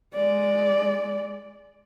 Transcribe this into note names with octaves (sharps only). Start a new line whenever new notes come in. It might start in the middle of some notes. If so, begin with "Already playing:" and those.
G#3 D5